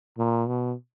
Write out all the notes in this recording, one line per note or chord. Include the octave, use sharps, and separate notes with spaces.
A#2
B2